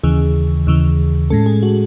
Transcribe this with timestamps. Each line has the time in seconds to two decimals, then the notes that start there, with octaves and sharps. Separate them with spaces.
0.03 D#2 C#3 E3 G#4
0.67 D#2 C#3 E3
1.30 A2 G#3 C#4 A4
1.46 G#4
1.63 F#4